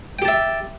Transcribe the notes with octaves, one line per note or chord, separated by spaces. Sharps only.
G4 E5 G5 A5